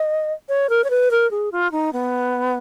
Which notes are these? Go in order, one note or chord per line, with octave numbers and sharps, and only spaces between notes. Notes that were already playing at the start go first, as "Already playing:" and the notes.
Already playing: D#5
C#5
A#4
C#5
B4
A#4
G#4
F4
D#4
B3